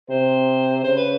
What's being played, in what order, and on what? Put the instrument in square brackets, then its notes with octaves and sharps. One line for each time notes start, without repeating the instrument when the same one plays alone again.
[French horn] C3 [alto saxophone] C5
[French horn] C#3 [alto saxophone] C5
[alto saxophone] B4